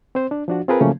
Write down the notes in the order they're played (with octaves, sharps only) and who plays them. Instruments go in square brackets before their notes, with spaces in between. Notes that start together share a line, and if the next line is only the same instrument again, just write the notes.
[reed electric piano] C4 C5
D4
F3 D4 F#4
C4 F4 G#4 A#4 B4
C#3 F3 F#3 A3 A#3 C#4